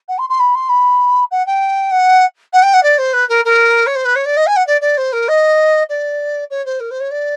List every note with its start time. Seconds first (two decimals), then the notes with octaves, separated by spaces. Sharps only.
0.08 F#5
0.18 C6
0.29 C6
0.40 B5
0.55 C6
0.69 B5
1.31 F#5
1.47 G5
1.91 F#5
2.53 F#5
2.63 G5
2.74 F#5
2.83 D5
2.98 C5
3.13 B4
3.29 A#4
3.45 A#4
3.87 C#5
3.95 C5
4.05 B4
4.16 C#5
4.25 D5
4.37 D#5
4.47 G#5
4.56 F#5
4.67 D5
4.81 D5
4.97 C5
5.13 A#4
5.28 D#5
5.89 D5
6.50 C#5
6.66 C5
6.80 A#4
6.91 C5
7.00 C#5
7.11 D5